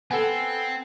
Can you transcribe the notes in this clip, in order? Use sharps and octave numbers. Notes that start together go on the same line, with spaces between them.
B3 C4 A4 G#5